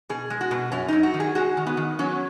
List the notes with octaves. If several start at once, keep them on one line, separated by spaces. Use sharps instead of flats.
B2 G#4
G#3
F#4
B2
F#2 C#4
F#2 D#4
F#4
D#3
G#4
G#3 F#4
D#3
B3
D#3
F#3 C#4